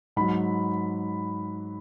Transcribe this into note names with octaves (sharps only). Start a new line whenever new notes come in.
G#2 F#3 B5